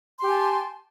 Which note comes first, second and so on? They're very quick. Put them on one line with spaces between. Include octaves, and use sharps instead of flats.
C6 G4 G#5 A5